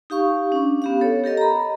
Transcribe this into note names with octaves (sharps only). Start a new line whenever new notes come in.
D#4 G4 F5 C#6
C#4 D4
B3 G4 F5
A4 C#5
G4 A4 A#4 D#5
A#5 B5